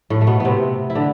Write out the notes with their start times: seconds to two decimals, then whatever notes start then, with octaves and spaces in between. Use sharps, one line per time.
0.10 A2 A3
0.21 A3
0.27 B2 B3
0.40 C3 B3 C4
0.90 E4
0.95 D3 D4